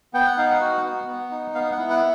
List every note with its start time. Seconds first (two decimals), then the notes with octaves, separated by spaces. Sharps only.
0.14 B3 G5
0.26 F#5
0.38 D#4 F5
0.50 F#5
0.61 F#4
0.84 B3
1.07 B3
1.31 D#4
1.55 B3 F5
1.72 F#5
1.78 E4
1.90 F#5